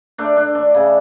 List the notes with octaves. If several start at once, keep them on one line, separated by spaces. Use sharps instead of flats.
A3 D4
D4
D4
C#3